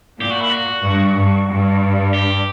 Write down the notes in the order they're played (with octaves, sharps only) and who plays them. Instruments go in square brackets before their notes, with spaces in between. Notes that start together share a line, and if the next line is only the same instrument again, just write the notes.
[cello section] A#2 [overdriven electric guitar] G4
[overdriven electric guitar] F#4
E4
F#4
[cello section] G2
G2
G2
[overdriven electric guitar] G4